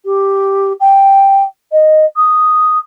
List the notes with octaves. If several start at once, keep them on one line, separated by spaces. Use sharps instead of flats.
G4
G5
D#5
D#6